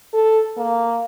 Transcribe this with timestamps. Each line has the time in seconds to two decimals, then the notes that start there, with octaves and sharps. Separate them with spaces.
0.13 A4
0.57 A#3